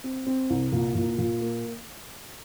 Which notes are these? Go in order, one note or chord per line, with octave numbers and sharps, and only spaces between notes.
C4
C4
C2
A#2
A#2
A#2
A#3